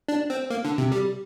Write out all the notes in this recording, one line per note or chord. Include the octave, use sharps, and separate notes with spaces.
D4
C4
A#3
D3
C3
G3